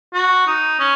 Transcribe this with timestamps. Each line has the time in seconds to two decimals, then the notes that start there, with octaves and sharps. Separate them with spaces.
0.14 F#4
0.47 D#4
0.80 C#4